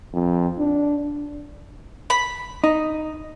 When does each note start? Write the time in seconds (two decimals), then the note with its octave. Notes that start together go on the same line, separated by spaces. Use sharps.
0.14 F2
0.59 D4
2.10 B5
2.64 D#4